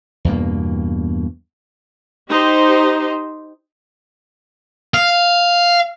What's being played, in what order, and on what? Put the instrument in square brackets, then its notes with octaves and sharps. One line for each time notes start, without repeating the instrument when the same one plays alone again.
[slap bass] E2 G2 B2 A#3
[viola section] D#4 G4 C5
[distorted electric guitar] F5